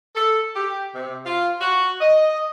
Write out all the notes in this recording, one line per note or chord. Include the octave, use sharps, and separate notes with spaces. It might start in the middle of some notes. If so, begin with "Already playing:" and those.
A4
G4
C3
F4
F#4
D#5